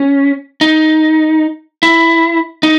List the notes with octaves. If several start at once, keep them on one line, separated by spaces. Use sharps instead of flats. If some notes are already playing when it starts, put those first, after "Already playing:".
Already playing: C#4
D#4
E4
D#4